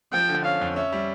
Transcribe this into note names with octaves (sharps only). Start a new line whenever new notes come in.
F3 G5
D3
C#4 F5
F2
C#4 E5
G3